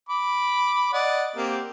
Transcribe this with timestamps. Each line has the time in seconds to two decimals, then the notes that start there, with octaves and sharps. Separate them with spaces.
0.09 B5 D6
0.93 D5 D#5 F#5
1.36 A#3 C4 G4